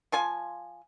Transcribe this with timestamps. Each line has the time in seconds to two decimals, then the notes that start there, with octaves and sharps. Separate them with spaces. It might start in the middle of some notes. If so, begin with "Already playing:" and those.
0.12 F3 F4 G#5